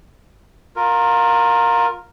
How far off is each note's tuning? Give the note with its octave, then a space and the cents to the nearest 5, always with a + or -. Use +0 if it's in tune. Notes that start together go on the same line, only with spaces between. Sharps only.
F4 +25 A#4 +0